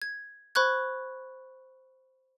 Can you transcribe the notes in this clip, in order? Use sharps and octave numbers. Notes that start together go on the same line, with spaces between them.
G#6
C5 B5 C#6 F#6 G#6